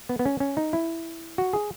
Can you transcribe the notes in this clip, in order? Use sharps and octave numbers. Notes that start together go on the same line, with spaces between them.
B3
B3
C#4
C#4
D#4
E4
F#4
G#4